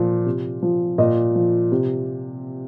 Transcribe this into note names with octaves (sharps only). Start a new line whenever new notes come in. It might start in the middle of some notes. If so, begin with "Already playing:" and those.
Already playing: A#2 F3
C3
F3
A#2 D#5
F3
C3